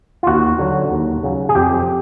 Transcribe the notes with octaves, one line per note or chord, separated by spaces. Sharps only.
F4
D#2 F#4
D3 F#3
D#2
C#3 F#3
G#4
F2 G4